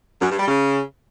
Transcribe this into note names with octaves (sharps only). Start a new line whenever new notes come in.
F#2
G2
G3
C#3